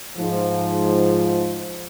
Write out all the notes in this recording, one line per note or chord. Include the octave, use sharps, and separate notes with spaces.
G#2 F3